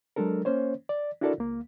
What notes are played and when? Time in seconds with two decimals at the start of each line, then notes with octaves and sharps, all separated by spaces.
0.16 F#3 G#3 D4 A4 A#4
0.45 A#3 C#4 C5 C#5
0.89 D5
1.21 D4 E4 F#4 A4 A#4 D5
1.38 C#2 A#3